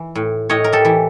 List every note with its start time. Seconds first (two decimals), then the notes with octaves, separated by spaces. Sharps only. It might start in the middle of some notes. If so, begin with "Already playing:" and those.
Already playing: E3
0.15 A2
0.49 A2 C#5 D#5
0.64 A#4
0.72 G4 A4
0.85 E3